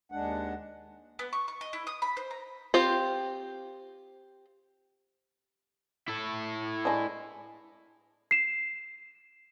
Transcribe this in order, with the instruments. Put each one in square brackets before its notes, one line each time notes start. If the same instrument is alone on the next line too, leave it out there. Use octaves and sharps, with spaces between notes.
[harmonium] D#2 G#3 D4 F#5
[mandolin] B3
C#6
C#6
D#5
E4
D#6
B5
C5
A#5
[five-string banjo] C4 F4 G4 C5
[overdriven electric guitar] E4 A4
[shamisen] G#3 D4
[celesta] C7 E7